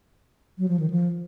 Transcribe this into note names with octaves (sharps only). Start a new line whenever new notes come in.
F#3
F3
D#3
F3